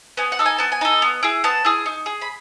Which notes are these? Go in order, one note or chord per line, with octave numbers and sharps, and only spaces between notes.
B3 G#5
F#5
D#4 A4
G#5
B3 A5
G#5
D#4 A4
B3
E4 G#4
B3 A5
E4 G#4
D#4
G#4
B5